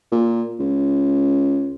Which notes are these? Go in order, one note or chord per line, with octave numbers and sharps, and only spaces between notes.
A#2
C#2